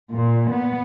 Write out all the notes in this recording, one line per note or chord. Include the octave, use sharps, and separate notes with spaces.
A#2
B3